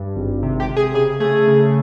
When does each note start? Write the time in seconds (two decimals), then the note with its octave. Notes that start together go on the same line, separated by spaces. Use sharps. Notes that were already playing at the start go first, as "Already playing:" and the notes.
Already playing: G2
0.16 G#1
0.43 C3
0.60 G4
0.69 C3
0.76 G#4
0.94 C#3 G#4
1.20 A3 G#4
1.48 C#3